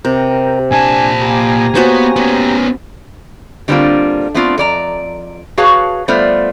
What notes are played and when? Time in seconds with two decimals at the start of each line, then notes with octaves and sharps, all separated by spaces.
0.05 C3 G4 A#4
0.71 A#2 D4 G#5 A5
1.22 A#3 G4 G#5 A#5
1.75 B3 F#4 C5 C#5
2.16 B3 C#4 C6
3.68 D3 G3 A#3 C4 D4 F4
4.34 A3 B3 C4 D4 F4
4.58 F2 D5 A#5
5.58 F#4 G#4 B4 C#5 F5 A5
6.08 G3 A3 B3 F4 C5 D5